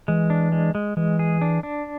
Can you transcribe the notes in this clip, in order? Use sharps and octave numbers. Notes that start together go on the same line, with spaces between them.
E3 G#3
D4
G#3
G#3
E3 G#3
G#4
D4
D4